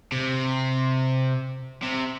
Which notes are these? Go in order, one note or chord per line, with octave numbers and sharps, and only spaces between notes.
C3
C3